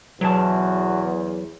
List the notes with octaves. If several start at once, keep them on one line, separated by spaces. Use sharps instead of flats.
B1 E2 E3 F#3 F#4 A5